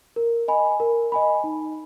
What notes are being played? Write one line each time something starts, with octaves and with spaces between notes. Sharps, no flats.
A#4
D#5 G#5 B5
A#4
D#5 G#5 B5
D#4